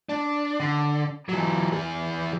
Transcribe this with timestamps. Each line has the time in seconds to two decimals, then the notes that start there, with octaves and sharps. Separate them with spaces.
0.09 D4
0.60 D3
1.29 E3 F#3
1.73 E3 G#4